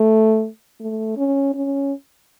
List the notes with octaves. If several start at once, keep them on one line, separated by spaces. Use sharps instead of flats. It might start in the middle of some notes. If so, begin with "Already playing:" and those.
Already playing: A3
A3
C#4
C#4